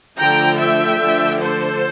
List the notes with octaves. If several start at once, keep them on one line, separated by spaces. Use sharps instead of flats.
D3 F3 A3 D4 G5 A#5
E5 G5
D3 F3 A3 D4
A4 C5